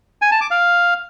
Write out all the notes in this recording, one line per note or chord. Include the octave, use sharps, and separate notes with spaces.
G#5
A5
D6
F5